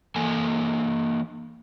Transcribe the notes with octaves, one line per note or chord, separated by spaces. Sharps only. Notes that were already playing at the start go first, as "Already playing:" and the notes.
E3 A#3 A4 G#5